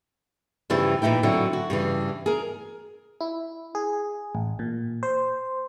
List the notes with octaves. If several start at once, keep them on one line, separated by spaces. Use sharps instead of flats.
G2 C#3 E3 F3 G3 E4
A#2 E3 D#4 E4 G5
D3 F#3 C4 E4 F#4
F#4
G2 C#3 E3
G#4 A#4
E4
G#4
A1
A#2
C5